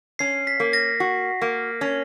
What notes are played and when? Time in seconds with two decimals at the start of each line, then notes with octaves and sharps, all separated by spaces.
0.19 C#4 C7
0.47 B6
0.60 A#3
0.73 A#6
1.00 F#4
1.42 A#3
1.81 C#4